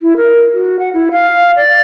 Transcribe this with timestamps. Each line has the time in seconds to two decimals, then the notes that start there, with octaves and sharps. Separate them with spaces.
0.02 E4
0.17 A#4
0.53 F#4
0.79 F#5
0.93 E4
1.11 F5
1.56 D5